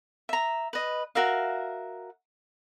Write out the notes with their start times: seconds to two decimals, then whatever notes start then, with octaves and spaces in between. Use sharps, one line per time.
0.29 E5 A#5
0.73 B4 D#5
1.15 F#4 A#4 E5 F5